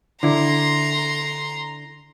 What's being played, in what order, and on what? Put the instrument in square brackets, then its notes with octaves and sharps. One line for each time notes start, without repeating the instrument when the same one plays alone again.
[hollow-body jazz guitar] D3 E4 [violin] A#5 C6